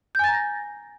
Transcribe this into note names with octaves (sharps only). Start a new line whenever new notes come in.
G#5 A#5 G6 A6 A#6